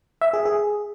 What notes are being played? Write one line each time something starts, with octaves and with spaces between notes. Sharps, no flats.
E5
G#4
G#4